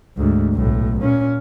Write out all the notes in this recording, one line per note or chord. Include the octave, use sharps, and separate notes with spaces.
D2 G#2
B1 A2
A#2 C#4